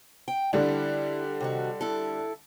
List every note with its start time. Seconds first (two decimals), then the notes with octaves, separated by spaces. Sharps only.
0.28 G5
0.53 D3 G3 D4 E4
1.41 C3 D#3 F#4
1.81 E4 A4